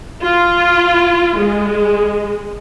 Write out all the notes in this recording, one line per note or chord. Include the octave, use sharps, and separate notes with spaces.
F4
G#3